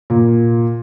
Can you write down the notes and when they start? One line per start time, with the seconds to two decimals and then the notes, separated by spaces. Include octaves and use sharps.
0.10 A#2